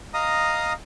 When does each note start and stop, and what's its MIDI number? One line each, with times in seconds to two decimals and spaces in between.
0.14 0.73 75
0.14 0.73 77
0.14 0.73 82
0.14 0.73 87